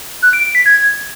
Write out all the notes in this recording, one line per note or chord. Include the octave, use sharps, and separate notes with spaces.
F#6
D7
D7
B6
G#6